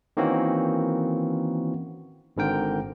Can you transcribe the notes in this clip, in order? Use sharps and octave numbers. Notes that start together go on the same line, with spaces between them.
D#3 E3 A#3 C4 C#4 F#4
G#1 G#2 D3 A#4 G5